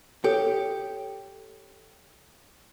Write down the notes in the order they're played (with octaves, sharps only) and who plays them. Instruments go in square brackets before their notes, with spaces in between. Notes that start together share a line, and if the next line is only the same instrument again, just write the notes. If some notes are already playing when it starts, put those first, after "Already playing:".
[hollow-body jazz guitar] G4 [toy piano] A4 [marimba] C#5